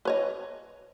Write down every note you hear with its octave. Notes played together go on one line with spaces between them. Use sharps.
B4 C#5 D#5